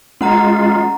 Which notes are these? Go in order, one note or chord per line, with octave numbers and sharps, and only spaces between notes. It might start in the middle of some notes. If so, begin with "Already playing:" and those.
G#3 C#4 F4 F#5 A#5